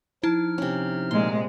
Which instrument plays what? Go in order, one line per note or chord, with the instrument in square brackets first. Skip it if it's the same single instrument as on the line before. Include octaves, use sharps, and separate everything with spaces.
[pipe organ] F3 D#4 F6 [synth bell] E4 [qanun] A5
[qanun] C3 C#4
[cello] A#2 G#3 [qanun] C6